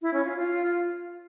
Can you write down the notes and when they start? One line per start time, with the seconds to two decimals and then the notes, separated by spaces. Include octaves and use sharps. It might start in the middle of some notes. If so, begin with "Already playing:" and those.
0.02 E4
0.13 C#4
0.25 F4
0.36 F4